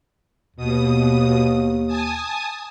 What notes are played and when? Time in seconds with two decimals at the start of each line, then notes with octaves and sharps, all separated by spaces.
0.56 D#2 B2 D#6
1.87 G#5 A5 D#6